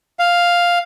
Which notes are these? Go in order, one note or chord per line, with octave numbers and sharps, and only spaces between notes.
F5